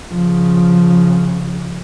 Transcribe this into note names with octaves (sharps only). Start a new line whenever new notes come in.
C#3 F3